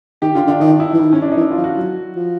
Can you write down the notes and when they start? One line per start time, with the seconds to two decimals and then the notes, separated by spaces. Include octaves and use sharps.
0.22 D#3 G4
0.35 D3 F4
0.47 D3 D4
0.60 D#3 D#4
0.80 E4
0.93 E3
0.99 D#3
1.13 C#4
1.22 D4
1.32 D#4
1.37 E3
1.41 E4
1.51 F4
1.57 F3
1.64 F#4
1.76 F#3
2.16 F3